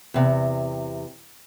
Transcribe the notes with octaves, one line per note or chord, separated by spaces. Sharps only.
E2 C3